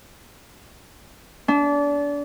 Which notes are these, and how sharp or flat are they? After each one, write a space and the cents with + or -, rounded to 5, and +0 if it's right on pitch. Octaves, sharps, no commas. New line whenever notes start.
D4 -30